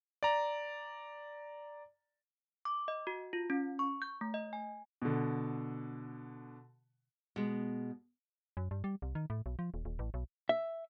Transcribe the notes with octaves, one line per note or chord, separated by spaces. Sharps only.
D5 A#5
D6
D#5
F#4
F4
C#4
C#6
G6
A3
D#5
G#5
B2 D3
B2 G#3
F#2
G2
G3
C2
D#3
A2
B1
F3
D#1
D#1
A1
B1
E5